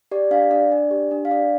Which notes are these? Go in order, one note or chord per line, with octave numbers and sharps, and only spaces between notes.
G4 D5
D4 F5
D4 D5
D4
G4
D4
F5
D4 D5